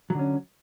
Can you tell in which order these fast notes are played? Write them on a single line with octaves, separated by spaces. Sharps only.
F#3 D3 C#4